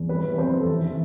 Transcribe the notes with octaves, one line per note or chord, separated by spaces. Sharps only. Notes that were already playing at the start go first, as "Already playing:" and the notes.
Already playing: E2
G3 B4
E3
B4
F2 C5
E3
A4
E3
E3